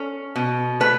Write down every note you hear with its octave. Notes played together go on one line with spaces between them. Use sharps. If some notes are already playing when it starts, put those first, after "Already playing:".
Already playing: C#4 A4
B2
A3 B4